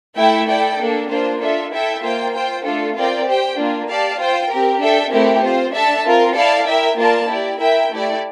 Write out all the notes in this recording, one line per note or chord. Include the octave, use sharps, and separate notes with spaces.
A3 E4 A4 E5 G5
E4 A4 D5 G5
A#3 D4 A4
A#3 D4 F4 C5
D4 F4 A4 E5
E4 A4 E5 G5
A#3 F4 C5 G5
F4 C5 G5
A3 D4 F4 A4
C4 F4 A#4 D5 G5
G4 C5 G5
A#3 D4 F4
G4 D5 F5 A5
F4 C5 G5
C4 G4 A#4
D4 A4 E5 G5
A3 C4 E4 G4 A#4
C4 F4 C5
D4 A4 E5 A5
C4 F4 A#4
E4 A4 D5 F5 A5
E4 A#4 E5 G5
A#3 F4 A#4 D5 A5
E4 G4 D5
E4 A#4 E5 G5
A3 E4 G4 D5